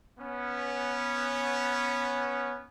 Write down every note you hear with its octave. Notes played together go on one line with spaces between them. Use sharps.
B3 C#4